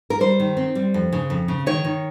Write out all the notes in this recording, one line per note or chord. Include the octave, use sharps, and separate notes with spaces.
A#4
G3 C5
D#3
C4
G3
F2
C#3
F2
C#3
D#3 C#5
D#3